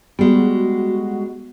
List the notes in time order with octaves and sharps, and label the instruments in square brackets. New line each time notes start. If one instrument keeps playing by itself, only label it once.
[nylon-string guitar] G3 G#3 [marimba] B3 [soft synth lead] F#4